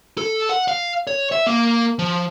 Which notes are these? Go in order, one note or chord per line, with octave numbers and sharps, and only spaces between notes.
A4
F#5
F5
C#5
E5
A#3
F3